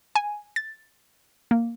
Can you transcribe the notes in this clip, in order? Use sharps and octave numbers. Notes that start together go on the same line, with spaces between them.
G#5
A6
A#3